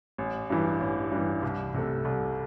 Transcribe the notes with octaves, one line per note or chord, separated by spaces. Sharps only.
A1
G2 E3
A1
G2 E3
C2
C3 A3
C2